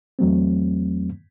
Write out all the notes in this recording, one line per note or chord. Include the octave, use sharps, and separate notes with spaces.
E2 F#3 A3 C4